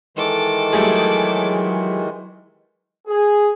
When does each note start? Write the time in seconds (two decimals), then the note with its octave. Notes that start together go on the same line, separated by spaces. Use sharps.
0.17 D#3 E3 G#3 A4 D6
0.73 F#3 G3 A3 G#4
3.07 G#4